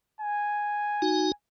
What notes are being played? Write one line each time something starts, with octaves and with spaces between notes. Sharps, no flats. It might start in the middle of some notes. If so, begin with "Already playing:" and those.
G#5
D#4 F#4